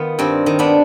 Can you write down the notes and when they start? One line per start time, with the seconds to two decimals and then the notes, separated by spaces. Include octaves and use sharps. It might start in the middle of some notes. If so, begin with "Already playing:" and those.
Already playing: D#3 B3 F4
0.19 G2 C4
0.46 D#3
0.59 B3 D4